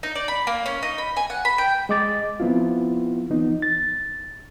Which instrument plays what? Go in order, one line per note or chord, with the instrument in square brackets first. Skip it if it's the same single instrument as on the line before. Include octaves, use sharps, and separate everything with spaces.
[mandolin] D#4
D5
B5
A#3
C#4
D#4
B5
G#5
F#5
B5
G5
[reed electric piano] G#3 D#5 D6 A6
F3 B3 C4 E4 F4
E3 F3 B3 D#4
A6